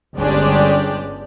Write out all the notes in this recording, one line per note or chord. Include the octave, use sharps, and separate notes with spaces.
G1 G#3 C#4 D4 G4 D5